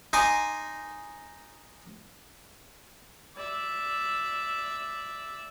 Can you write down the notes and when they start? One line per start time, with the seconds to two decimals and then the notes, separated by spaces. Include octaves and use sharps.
0.13 D#4 G#5 C6 D6 D#6
3.36 D5 E5